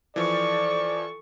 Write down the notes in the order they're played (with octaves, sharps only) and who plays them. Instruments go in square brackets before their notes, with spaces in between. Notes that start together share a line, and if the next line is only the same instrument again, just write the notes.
[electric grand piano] E3 F3 [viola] A4 C#6 [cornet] D5